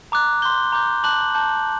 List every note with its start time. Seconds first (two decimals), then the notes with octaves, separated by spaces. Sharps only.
0.12 A#5 D6 F#6
0.42 C6 G6 G7
0.72 A#5 D6 G6
1.03 A5 D6 F#6 F#7
1.34 A5 D6 G6